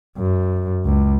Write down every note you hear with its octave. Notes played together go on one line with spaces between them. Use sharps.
F#2
C#2